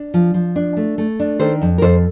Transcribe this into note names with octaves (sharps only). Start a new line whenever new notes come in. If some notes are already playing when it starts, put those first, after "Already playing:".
Already playing: D4
F3
F3
D4
A3
A3
D4
D#3 A4 C5
F2
A#4
F2 A4 C5